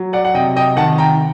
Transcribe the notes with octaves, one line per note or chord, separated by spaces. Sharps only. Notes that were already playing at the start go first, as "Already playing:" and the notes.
Already playing: F#3
D5 F#5
F#5
C3 D#5 G5
D#5 G5
D#3 F#5 A5
G5 A#5